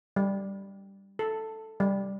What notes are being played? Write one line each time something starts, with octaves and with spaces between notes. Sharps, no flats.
G3
A4
G3